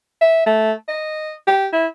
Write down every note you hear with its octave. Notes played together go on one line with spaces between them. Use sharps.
E5
A3
D#5
G4
E4